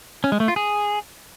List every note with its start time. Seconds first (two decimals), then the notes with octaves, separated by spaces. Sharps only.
0.24 C#4
0.32 G#3
0.40 A3
0.48 F4
0.56 G#4